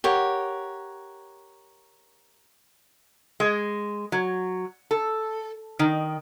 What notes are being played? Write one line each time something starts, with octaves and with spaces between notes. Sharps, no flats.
G4 A#4 C#5 F#5
G#3
F#3
A4
D#3